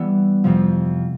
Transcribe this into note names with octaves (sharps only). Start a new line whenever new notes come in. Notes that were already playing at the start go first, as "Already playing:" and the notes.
Already playing: E3 G3 B3
F2 C3 F3